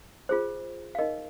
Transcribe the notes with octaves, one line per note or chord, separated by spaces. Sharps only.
F4 G#4 C5
F5
D#4 A#4 D#5